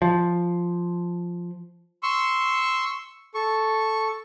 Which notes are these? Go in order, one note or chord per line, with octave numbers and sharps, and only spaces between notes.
F3
C6 C#6 E6
A4 C#6